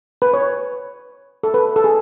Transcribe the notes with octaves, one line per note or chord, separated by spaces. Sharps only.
B4
C#5
A4
B4
A4
G#4